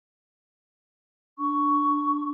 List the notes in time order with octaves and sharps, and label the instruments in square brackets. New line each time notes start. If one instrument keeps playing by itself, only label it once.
[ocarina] D4 [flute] C#6